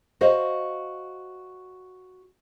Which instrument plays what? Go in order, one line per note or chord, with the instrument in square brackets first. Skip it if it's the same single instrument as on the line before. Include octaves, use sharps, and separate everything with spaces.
[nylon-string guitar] F#4 C5 D#5 F5